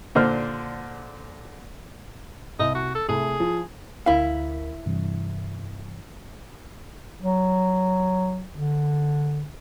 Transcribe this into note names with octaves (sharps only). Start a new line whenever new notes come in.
A#2 D3 C5 F6
C2 D#5
F#4
A4
C2 A3 G#4
F3
D2 E4 A#4 F5 B6
G2 C3 E3
F#3
D3